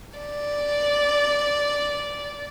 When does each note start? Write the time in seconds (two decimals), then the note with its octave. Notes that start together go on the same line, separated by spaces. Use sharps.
0.19 D5